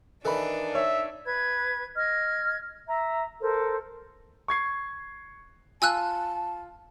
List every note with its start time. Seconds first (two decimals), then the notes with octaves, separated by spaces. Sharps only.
0.25 D#3 E3 D4 D#4 A4 B5
0.75 C#5 E5
1.25 B4 G#6
1.96 D#5 F6 G#6
2.88 E5 A#5
3.40 A4 A#4 C5
4.48 C#6 G#6 C7
5.82 F4 G#5 A5 E6 F#6